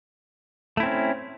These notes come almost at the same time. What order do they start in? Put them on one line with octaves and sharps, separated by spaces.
A3 E4 C4 C#4